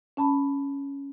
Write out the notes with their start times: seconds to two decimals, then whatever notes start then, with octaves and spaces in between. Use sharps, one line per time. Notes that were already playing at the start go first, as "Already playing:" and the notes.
0.17 C#4 A5 B5